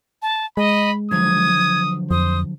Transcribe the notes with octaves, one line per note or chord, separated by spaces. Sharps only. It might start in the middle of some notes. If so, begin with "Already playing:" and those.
A5
G#3 D#5 B5
D3 F3 F#3 D#6 G#6
F2 C5 D#6